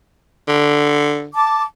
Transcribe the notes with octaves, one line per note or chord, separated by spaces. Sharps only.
D3
A5 D6